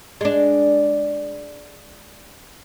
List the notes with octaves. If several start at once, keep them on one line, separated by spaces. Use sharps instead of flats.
G#3 D4